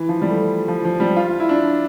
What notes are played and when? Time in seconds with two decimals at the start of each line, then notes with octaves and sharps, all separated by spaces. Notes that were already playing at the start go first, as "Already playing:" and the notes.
Already playing: E3
0.09 F3
0.22 G3
0.30 A3
0.68 F3
0.85 F3
1.00 G3
1.16 F4
1.40 E4
1.49 D4